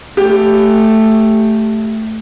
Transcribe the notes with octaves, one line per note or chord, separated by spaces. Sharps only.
A3 G4